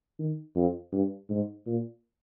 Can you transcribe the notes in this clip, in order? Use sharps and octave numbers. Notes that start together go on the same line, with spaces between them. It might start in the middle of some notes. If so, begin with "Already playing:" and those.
D#3
F2
G2
G#2
A#2